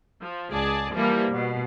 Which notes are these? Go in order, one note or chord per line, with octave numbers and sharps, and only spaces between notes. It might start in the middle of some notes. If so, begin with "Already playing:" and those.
F3
C#2 G#4 D5 A5
E3 F3 G3 A#3
B2